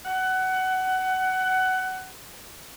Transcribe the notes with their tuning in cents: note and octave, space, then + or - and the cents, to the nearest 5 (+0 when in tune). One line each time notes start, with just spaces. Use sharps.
F#5 +20